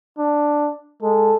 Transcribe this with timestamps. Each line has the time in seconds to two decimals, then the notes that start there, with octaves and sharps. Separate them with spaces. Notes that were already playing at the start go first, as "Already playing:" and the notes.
0.18 D4
1.03 G#3 A4